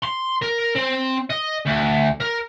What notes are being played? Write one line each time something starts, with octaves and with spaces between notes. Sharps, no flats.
C6
A#4
C4
D#5
D2
A#4